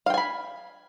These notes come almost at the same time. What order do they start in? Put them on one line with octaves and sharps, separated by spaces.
F5 G5 G#5 B5